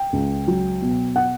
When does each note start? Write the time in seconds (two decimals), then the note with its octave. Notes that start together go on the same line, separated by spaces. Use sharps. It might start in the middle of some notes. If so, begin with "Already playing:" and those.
Already playing: G5
0.13 C#2
0.47 F#3
0.82 B2
1.16 F#5